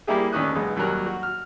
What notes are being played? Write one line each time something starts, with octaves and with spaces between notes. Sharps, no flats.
G3 A#3 E4 G4 G#4
D2 D#3 C#4 D#6 F#6
B1 G#3
D#2 F#3 G3 A#4 F#6
F#4
F6